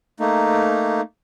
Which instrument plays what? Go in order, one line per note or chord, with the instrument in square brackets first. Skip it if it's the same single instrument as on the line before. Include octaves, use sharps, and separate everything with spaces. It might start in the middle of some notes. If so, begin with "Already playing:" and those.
[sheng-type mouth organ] A3 A#3 D#4